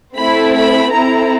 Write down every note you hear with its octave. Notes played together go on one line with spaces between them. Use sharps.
A3 C4 E4 B5
B5
C4 E4 A4 A#5